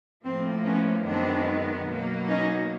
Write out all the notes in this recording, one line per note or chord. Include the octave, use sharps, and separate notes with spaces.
A2 F3 A#3 C4
B3 C#4
F#2 D#3 G#3 B3 C4 D4
B2 F#3 A#3
C#4 D#4